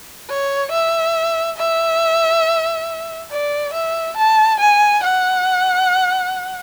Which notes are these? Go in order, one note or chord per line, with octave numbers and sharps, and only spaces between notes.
C#5
E5
E5
D5
E5
A5
G#5
F#5